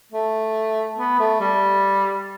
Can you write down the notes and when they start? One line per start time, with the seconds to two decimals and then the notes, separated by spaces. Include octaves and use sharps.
0.12 A3
0.97 B3
1.19 A3
1.40 G3